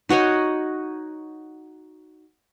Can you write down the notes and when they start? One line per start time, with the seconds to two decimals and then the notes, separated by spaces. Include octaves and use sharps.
0.09 D#4 F#4 C#5 D#5